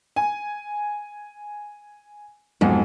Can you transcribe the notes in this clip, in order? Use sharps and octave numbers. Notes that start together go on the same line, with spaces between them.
G#5
F1 B1 G#2